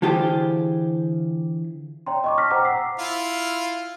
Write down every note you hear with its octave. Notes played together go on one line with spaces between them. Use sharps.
D3 E3 F4 G4 G#4 C5
C#5 D5 G5 A#5 C6
D#5 C#6 D6
A5 F6 A#6 B6
C5 F#5 G5 A#5 D6
E6 B6 C7
E4 F4 F5